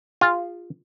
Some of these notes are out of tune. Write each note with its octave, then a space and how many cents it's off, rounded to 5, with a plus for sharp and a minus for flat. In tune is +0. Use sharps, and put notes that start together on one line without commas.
F4 +0 G#4 -40